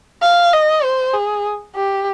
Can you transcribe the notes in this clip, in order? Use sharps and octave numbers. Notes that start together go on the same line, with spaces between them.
F5
D#5
C5
G#4
G4